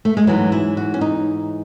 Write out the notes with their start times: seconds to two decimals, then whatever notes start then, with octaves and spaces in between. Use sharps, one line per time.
0.05 A3
0.17 G#3
0.27 G#2 E3 F#3
0.52 E4
0.77 F#4
0.94 C#4
1.01 D#4